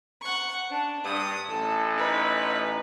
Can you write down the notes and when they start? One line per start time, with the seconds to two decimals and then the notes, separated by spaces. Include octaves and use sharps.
0.21 F#5 C#6
0.70 D4
1.05 G2 D#6
1.49 A1 A4
1.96 D#4 B4